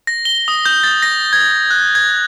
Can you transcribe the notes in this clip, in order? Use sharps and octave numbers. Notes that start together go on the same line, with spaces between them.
A#6
G7
D#6
G6
A6
A#6
G#6
F#6
G#6